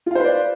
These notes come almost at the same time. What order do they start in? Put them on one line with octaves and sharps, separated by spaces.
F4 F5 C5 B4 D5